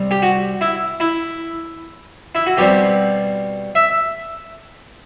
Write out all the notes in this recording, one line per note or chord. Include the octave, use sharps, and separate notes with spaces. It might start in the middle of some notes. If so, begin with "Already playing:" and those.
Already playing: C3 G3
G4
F#4
E4
E4
E4
F#4
B2 G3 C4 G4
E5